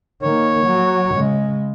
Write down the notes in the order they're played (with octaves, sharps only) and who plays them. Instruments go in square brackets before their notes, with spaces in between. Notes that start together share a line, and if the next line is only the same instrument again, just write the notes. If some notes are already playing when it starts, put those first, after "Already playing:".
[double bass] D#3 A#3 [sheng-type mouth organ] C#5
[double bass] F#3
C#3 G#3